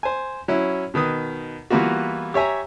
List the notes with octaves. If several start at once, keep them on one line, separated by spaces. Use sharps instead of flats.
C5 G#5
F#3 C#4 E4
B2 D#3 B4 D#6
E3 G3 A#3 B3 F4 F#4
G4 C#5 E5 G#5 A#5